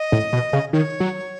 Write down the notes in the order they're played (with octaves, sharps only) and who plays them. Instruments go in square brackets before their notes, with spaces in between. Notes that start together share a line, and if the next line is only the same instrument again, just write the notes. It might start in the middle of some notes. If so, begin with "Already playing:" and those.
Already playing: [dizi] D#5
[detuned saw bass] A2
B2
C#3
[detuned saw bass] D#3 [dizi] C#5
[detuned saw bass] F#3